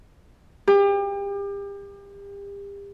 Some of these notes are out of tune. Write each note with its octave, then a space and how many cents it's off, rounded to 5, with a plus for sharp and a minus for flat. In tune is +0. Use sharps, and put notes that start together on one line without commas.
G4 +35